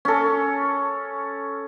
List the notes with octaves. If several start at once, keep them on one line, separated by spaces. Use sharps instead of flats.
C#4 A4